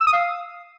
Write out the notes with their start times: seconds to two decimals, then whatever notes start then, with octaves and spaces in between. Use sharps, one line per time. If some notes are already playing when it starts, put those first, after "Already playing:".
0.01 E6
0.07 D#6
0.13 F5